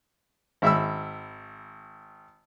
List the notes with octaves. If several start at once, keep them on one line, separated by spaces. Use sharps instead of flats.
G#1 E5 B5 E6